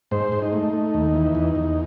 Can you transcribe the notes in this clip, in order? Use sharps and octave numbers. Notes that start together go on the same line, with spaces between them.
G#2 C5
G#2
D#4
A3
A3
D#2
E3
E2
E2